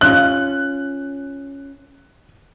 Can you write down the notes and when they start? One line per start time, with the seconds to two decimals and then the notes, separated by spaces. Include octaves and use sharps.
0.01 C#4 F4 F#6